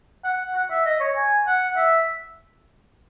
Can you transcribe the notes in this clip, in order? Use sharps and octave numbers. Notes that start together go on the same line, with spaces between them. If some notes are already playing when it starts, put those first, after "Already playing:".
F#5
F#5
E5
D#5
C#5
G#5
F#5
E5